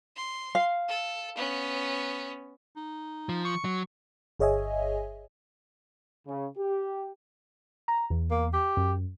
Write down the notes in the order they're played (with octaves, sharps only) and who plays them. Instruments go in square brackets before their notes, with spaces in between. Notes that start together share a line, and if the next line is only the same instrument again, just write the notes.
[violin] C6
[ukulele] F5
[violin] A4
B3 C#4
[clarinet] D#4
[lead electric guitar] F3
[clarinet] C#6
[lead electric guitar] F#3
[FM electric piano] G1 G#4 C#5 D#5 E5 G#5
[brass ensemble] C#3
G4
[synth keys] A#5
E2
[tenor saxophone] A#3
G4
[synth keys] F#2